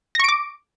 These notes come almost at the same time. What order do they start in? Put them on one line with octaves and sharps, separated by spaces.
A#6 C#6 D7 D6